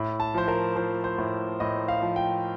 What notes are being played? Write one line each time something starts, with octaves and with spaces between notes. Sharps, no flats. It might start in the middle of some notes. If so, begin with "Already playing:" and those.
Already playing: A2
A5
F3 C5
A#4
F3 C5
C5
A2
A2 D#5
F5
F3
G5